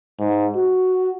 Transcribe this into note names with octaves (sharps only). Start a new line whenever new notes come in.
G#2
F#4